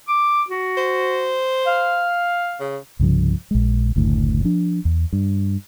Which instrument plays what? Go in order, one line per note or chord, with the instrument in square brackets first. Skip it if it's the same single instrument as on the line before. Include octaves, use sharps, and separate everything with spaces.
[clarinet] D6
F#4
[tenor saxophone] C5
[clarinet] F5
[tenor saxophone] C#3
[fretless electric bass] C2 G2 C#3 F3
A#1 G#3
F#1 D2 A2
F3 D4
E2
G2